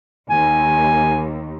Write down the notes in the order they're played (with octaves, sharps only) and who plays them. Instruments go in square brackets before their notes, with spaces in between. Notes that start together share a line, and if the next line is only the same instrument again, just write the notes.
[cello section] D#2 [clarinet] G#5